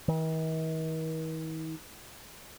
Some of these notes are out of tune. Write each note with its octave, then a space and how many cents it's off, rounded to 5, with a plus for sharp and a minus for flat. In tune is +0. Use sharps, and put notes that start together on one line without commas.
D#3 +45